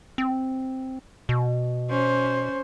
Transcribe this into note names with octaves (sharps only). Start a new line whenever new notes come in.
C4
B2
C#4 C5